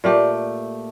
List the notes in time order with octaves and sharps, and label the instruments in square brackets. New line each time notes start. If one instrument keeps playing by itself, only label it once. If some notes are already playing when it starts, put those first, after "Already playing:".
[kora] A#2 A3 G4